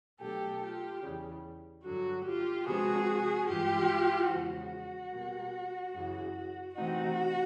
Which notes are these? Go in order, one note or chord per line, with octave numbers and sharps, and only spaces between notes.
B2 F#3 A3 D4 G4 A4
F4 G4
E2 C#3 E3 G3
G2 D3 F#3 F#4
F4 G4
C3 F3 G#3 B3 D4 F#4 G#4
G2 E3 G#3 F4 G4
E2 C#3 F3 G#3 F#4
B2 G3 A#3
F#2 C#3 E3
C3 E3 A3 C4 D#4 F#4